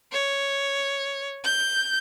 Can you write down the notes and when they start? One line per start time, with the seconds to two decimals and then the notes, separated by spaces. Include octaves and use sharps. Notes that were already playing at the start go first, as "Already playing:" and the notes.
0.12 C#5
1.44 G6